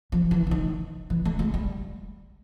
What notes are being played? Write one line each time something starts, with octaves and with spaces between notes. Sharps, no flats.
F3
E3
E3
D#3
E3
A3
G#3
G3